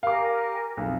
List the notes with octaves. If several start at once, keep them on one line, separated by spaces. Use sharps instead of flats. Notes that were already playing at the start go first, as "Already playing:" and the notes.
G4 A#4 F5 G#5 D6
B1 F2